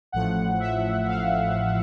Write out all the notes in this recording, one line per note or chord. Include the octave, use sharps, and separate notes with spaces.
A1 A2 F3 F#5
E5
F5